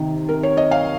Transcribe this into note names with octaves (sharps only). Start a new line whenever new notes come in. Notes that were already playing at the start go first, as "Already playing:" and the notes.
Already playing: C3 D#3
A#4
C#5
D#5
F5